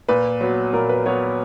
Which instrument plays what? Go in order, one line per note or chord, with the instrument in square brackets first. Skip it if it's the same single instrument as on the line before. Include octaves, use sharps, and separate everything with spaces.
[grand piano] A#2 [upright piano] B4
[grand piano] F#3 B3
[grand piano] A#2 [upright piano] A#4
[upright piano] B4
[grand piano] F#3 B3 [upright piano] C#5